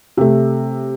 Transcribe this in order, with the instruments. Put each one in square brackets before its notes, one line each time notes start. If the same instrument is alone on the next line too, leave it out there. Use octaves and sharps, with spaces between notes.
[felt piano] C3 A3